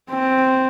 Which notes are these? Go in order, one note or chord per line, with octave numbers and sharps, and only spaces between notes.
C4